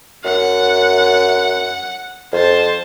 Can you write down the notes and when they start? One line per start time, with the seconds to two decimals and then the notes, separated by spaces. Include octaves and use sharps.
0.24 F#2 F#5
2.33 F2 C5 A5